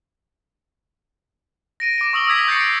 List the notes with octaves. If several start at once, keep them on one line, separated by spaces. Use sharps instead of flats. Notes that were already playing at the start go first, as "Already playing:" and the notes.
A#6 D7 D#7
D6 A#6 D7
C#6 D#6 E6 F#7 G7
D#6 E6 G#6 B6
C#6 G6 A6 A#6 C7 C#7
D7